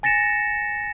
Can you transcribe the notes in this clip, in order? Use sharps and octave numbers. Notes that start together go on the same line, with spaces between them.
G#5 A6 A#6 C#7 E7